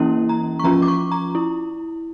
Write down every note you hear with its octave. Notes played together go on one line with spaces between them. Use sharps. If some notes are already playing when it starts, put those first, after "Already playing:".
Already playing: E3 A#3 C#4 E4
A#5
C#6
F3 C#4 F4 A#5
D6
C#6
A#5
E4